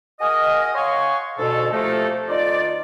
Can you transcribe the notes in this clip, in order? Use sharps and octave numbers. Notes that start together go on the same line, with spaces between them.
F#4 G#4 A#4 D#5
C#5 F5 F#5 G#5 C6 C#6
D2 G#2 B2 A4
C3 F3 A3 A#3 D#4 A4
D2 D#4 F4 D5